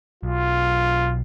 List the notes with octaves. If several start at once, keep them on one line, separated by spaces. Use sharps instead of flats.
B1 F4